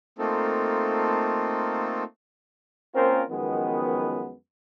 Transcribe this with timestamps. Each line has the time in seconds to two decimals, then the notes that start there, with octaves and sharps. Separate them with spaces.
0.19 A3 A#3 C4 D#4 F4 A4
2.95 A#3 C4 C#4 F4 A#4 C5
3.31 F#2 D#3 F3 G#3 B3